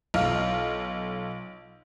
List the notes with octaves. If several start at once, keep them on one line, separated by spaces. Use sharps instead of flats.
B1 F4 F6